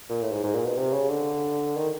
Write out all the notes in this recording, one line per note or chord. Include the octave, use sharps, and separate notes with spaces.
A#2
A2
G#2
G#2
A#2
B2
C3
C#3
D3
D#3